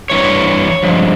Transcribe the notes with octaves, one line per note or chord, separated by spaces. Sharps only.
G2 E3 C#5
G2 F3 G#3